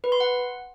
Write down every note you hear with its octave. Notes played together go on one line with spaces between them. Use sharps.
B4
C6
F#5